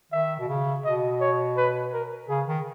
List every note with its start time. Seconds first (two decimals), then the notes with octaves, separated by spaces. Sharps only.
0.12 D#3 E5
0.40 B2
0.48 C#3
0.85 B2 D#5
1.21 C#5
1.57 B4
1.93 A#4
2.29 C#3 G#4
2.47 D#3